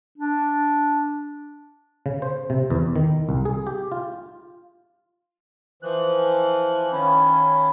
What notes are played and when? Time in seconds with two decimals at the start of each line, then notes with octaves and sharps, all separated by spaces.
0.18 D4
2.06 C#3
2.22 C5
2.50 C3
2.70 E2
2.96 D#3
3.29 C2
3.45 G#4
3.67 G4
3.92 F4
5.83 E3 F3 F#6
6.93 D#3 C#4 F5 B5